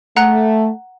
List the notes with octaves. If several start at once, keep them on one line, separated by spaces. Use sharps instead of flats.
A3 F#5 A#5 F#6